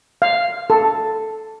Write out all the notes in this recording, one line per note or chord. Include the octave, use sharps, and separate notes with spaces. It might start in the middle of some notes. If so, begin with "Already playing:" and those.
F5
A4